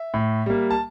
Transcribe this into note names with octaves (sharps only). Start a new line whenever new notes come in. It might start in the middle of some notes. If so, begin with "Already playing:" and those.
Already playing: E5
A2
G3 A#3
A5